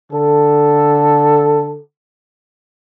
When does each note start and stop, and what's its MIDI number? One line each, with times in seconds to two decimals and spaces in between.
0.12 1.79 50
0.12 1.79 69